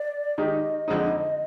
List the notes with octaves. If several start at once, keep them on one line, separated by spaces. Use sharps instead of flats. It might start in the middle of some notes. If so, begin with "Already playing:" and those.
Already playing: D5
D#3 G#3 D#4 G4 D#5
F2 D3 G#3 C4 D#4